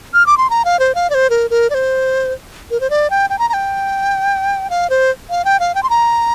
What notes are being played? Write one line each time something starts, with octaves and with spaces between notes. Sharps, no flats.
F6
D6
C6
A#5
F5
C5
F5
D5
C5
A#4
A#4
D5
C5
A#4
C5
D5
G5
G5
A#5
A#5
G5
F5
C5
F5
G5
F5
G5
C6
A#5